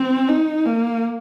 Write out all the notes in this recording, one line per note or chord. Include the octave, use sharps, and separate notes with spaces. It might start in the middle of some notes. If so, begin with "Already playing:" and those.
Already playing: C4
D#4
A#3